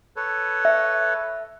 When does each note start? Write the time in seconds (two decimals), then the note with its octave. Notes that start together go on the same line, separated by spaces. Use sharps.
0.16 A4 B4 C#5
0.65 E5